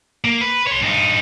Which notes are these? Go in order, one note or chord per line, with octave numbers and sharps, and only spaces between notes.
A#3
B4
C#5 C6
G2 D#4